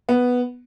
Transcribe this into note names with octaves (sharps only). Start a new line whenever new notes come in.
B3